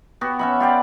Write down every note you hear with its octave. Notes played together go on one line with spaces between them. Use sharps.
B3 F#4 G4
C#4 E5 B5
F4 G4 D5